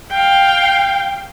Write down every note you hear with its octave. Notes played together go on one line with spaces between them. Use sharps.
F5 G5